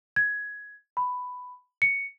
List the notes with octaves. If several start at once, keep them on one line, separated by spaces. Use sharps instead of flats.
G#6
B5
C#7